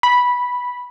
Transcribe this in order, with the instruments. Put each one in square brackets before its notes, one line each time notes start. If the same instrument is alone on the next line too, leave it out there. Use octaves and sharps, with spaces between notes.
[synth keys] B5